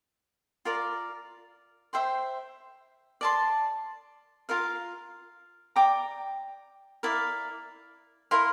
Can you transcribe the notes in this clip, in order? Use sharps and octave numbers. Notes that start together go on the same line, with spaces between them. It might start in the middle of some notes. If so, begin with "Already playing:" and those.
F4 A#4 D5
C5 E5 G5 C6
D5 A5 C6
F4 A#4 F5
D5 G5 A#5 D6
E4 A#4 D5 F5
E4 A#4 F5 C6